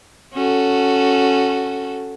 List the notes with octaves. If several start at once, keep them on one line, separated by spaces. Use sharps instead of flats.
C#4 F#4 A4